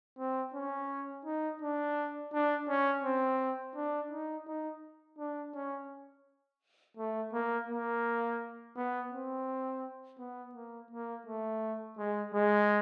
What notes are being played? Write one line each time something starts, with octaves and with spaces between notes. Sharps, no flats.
C4
C#4
D#4
D4
D4
C#4
C4
D4
D#4
D#4
D4
C#4
A3
A#3
A#3
B3
C4
B3
A#3
A#3
A3
G#3
G#3